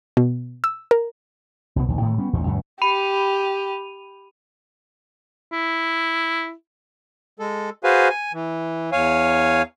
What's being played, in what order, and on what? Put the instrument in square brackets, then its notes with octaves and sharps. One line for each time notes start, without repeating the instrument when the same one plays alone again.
[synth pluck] B2
E6
A#4
[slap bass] C2 B2 D#3 B3
A#1 D#2
A2 D#3 A3
G3 B3 C#4
A1 E2 A#2 D#3
C#2 F#2 A#2 C#3
[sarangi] G4 [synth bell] B5 D#7 F7
[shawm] E4
[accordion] G#3 A4
F#4 G#4 B4 C5 F5 G#5
G#5
E3
E2 C#5 F5 G#5